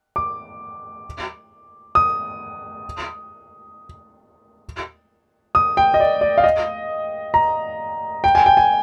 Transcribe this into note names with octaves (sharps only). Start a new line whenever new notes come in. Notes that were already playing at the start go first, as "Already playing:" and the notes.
D6
D#6
D#6
G5
D#5
D5
D5
F5
D#5
A#5
G5
G#5
G5
G#5